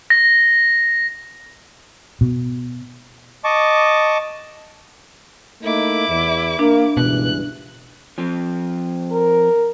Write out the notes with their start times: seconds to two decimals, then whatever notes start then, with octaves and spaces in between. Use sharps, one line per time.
0.10 A#6
2.21 B2
3.44 D#5 A5 C#6 D6
5.63 A3 A#3 D#4 E4 D6
6.08 E2
6.59 A#3 D4
6.97 C#2 G2 B2 E3 F#6
8.18 F3 C4
9.12 A#4